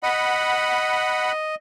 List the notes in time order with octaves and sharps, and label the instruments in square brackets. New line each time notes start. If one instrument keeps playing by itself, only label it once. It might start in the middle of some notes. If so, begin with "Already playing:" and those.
[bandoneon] D#5 [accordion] F#5 B5